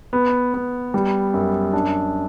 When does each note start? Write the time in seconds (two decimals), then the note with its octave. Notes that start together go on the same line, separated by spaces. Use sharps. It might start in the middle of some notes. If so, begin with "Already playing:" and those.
0.13 B3
0.54 B3
0.94 G3
1.34 F#2
1.73 D4